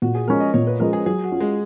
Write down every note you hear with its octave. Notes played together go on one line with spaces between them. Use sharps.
A#2 F#4
G#4
F3 G#3 C#4 A#4
D#5
A#2 C#5
B4
F3 G#3 C#4 A#4
G#4
F#3 G#4
F#4
C#4 F4
G#3